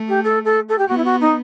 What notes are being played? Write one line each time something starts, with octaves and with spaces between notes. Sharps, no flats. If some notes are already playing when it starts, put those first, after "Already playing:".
Already playing: A3
G4
A4
A4
A4
G4
B3 F#4
E4
F#4
D#4